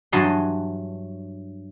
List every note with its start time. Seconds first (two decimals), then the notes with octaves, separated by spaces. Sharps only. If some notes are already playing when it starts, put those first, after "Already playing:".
0.13 G2 E3 F#3 D#5 A5 C6